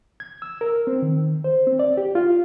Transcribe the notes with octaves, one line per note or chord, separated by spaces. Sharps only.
G#6
E6
A#4
C4
D#3
C5
C4
D5
G4
F4